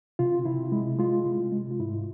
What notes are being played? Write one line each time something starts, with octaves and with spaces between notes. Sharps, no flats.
C3 F4
C3 E4
G#3 E4
G#3 F4
C3
G#3
F4
G#2 E4